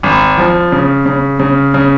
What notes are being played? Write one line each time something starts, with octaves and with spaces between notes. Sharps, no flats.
G#1
F3
C#3
C#3
C#3
C#3